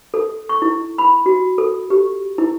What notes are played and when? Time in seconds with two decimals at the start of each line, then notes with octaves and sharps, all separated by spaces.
0.14 A4
0.49 C#6
0.62 E4
0.98 B5
1.26 F#4
1.58 A4
1.90 G4
2.38 E4